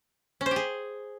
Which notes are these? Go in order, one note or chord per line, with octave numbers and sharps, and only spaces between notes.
C#4
C5
G4
G#4